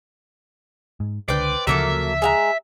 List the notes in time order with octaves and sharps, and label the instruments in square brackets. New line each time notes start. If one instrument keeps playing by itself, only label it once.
[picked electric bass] G#2
[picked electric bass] C#2 D3 [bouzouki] B4 C5 G5 [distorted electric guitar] D5
[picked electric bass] D2 C#3 F3 [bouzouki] F#3 A#3 A4 [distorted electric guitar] E5
[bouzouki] G#3 F5 A#5